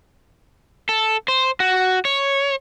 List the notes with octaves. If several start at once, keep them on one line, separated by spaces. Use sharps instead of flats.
A4
C5
F#4
C#5